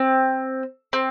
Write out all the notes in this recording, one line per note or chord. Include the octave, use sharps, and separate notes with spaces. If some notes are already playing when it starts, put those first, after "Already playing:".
Already playing: C4
C4